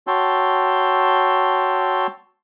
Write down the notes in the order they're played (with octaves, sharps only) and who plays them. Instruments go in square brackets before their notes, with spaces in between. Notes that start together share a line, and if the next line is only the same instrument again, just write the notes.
[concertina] F#4 C#5 G5 A5 C6 E6